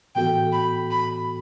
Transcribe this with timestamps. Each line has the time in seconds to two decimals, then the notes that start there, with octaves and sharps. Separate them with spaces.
0.15 A2 E3 B3 F#4 A4 G5
0.52 B5
0.91 B5